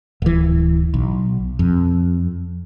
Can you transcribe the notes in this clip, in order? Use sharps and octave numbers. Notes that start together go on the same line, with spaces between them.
D1 E3
B1
F2